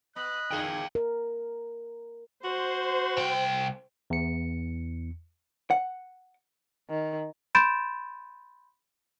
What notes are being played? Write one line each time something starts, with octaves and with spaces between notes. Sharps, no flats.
B3 D#5 B5 F#6
A#2 D3 G#4 F5 G5
A#4
F#4 C5
C2 G5
E2 C#7
F#5
D#3
B5 C6 G6 A6 D7 E7